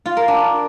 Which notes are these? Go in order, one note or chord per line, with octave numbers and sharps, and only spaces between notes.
F4
A#4
D4